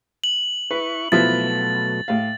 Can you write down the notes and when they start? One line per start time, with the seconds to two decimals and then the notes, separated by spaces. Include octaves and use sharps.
0.24 F#7
0.71 E4 B4 C#6
1.12 B2 F3 F#3 A3 B3 E4 A6
2.08 A2 F5